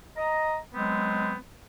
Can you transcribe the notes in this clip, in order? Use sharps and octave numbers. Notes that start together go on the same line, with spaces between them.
D#5 A#5
F#3 G#3 B3 C4